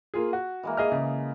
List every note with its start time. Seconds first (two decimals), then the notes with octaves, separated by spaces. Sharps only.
0.14 A#3 F4 G#4
0.33 F#4
0.63 E3 G#3 A#3
0.77 G#4 D#5 F6
0.92 C#3 D#5